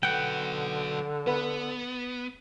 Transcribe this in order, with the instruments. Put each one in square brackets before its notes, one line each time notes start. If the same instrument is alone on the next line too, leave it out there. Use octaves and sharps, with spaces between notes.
[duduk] D3 [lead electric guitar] F#3 B4 [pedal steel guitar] F#5 G5
[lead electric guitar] B3 [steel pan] B4